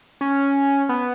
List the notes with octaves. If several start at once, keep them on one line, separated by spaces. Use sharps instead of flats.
C#4
B3